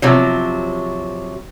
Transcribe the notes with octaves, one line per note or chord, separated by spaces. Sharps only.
C3 F3 F#3